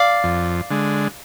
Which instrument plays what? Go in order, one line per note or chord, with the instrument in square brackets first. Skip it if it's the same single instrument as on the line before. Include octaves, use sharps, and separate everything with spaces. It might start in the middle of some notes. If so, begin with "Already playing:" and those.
Already playing: [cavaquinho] D5 F5
[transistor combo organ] F2
D3 G#3